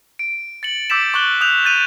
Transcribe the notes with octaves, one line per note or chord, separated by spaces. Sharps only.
D7
A6 C#7 F#7
D6 E6 G6 A6 B6 E7
C#6 D6 F#6 F#7 G7
D#6 F#6 G6 F7
G6 A6 D#7 F7